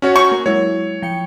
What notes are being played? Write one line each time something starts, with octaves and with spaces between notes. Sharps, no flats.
C#4 F#4 C#5
C#6 G6
A#3 A#4
F#3 G#3 E4 C#5
F3 G5 C#7